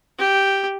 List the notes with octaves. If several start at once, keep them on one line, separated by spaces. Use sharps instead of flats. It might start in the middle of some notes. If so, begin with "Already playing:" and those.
G4